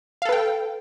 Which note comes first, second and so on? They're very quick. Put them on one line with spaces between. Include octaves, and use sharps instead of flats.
F5 A4 B4 G5